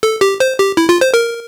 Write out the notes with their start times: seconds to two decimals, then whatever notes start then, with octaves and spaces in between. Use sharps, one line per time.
0.03 A4
0.21 G4
0.40 C5
0.59 G4
0.77 E4
0.89 F4
1.01 C5
1.14 A#4